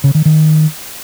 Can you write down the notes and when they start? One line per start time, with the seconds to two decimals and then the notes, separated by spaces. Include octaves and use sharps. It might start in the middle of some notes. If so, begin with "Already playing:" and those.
0.04 C#3
0.15 D#3
0.25 D#3